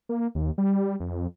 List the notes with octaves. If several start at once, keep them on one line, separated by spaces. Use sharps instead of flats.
A#3
D#2
G3
F2